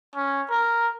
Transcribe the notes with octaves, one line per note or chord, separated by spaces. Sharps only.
C#4
A#4